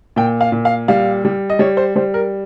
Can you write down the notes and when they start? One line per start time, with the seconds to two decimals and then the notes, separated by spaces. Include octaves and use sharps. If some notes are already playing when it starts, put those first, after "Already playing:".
0.16 A#2 G5
0.41 F5
0.52 A#2
0.65 F5
0.88 G3 F5
1.25 G3
1.50 D#5
1.59 G3 C#5
1.77 C5
1.96 G3 C5
2.14 A#4